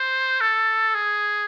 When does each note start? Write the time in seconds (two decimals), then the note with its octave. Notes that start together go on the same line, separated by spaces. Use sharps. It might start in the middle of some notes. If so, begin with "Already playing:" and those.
Already playing: C5
0.41 A4
0.95 G#4